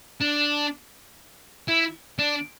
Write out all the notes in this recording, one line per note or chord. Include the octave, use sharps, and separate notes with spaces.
D4
E4
D4